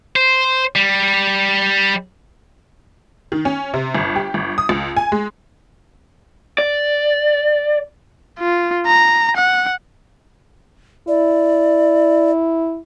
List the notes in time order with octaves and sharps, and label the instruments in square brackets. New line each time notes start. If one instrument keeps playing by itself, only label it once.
[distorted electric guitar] C5
G3
[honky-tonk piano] D#3
C#4
C3
G1
G4
G1
D#6
C#2
G#5
G#3
[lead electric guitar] D5
[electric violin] F4
A#5
F#5
[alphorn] E4 [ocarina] D5